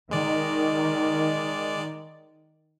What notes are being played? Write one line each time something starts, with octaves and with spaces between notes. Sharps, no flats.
D#3 G#3 D5